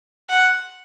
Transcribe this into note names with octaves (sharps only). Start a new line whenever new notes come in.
F#5